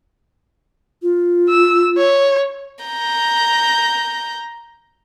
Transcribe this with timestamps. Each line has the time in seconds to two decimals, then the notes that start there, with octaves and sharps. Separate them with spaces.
1.02 F4
1.49 E6
1.98 C#5
2.84 A#5 G6